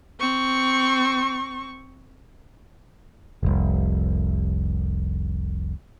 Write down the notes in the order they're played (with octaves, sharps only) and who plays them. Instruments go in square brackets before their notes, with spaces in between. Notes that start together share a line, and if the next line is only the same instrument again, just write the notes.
[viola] C4 C#6
[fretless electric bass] F1 C2